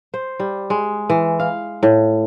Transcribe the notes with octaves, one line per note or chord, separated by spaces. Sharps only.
C5
G3
G#3
E3
F5
A2